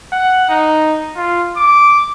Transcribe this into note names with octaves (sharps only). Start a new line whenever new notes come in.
F#5
D#4
F4
D6